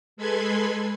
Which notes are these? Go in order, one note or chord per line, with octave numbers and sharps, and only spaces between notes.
G#3 A4 B4 B5 C6 G#6